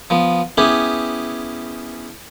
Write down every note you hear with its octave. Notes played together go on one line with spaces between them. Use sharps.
F3 B3
B3 C#4 E4 G4 G#4